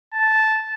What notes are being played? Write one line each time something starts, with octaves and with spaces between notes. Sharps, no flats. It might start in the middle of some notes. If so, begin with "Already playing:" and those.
A5